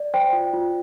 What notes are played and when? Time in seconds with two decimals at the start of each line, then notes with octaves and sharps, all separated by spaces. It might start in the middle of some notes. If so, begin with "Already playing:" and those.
Already playing: D5
0.14 C5 G5
0.33 F4
0.53 F4